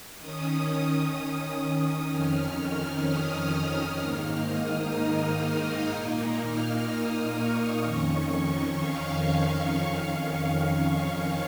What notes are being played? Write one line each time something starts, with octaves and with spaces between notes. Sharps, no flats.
D#3 C#4 D#6
F2 D#3 C#4 F6
D#6
G#2 D#3 A#3 D#4 F6
D#6
D#6
A#2 A#3 D#4
F6
D#6
C#6
F2 D#3 C#4 C#6
F5